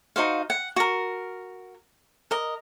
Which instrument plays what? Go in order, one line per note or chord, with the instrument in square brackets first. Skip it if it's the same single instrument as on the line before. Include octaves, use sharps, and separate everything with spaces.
[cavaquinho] D#4 F#4 C5 F5
F#5
F#4 A#4
A#4 D#5